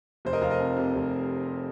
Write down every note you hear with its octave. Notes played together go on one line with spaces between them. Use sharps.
F1 C5
A#4 D#5
F1 C5 F5
A#4 D#5
F2
C3
F1